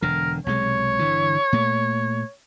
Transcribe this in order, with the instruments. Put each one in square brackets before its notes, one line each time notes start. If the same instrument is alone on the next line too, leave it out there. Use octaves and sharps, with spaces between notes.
[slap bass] E1 D3 [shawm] A#4
[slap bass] B1 C3 G#3 [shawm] C#5
[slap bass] G1 D3 E3
A#2 A3